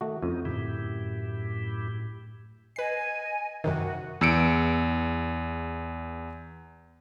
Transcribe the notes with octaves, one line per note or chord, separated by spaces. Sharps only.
D#3 A3 F#4
F2 C#4 D#4
F#2 A2 D3 E4 G4
B4 D#5 G#5 C7
F#2 C3 D#3 F#4
E2 E6 C#7 D7